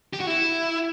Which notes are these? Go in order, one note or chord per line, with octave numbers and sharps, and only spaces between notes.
G4
F#4
E4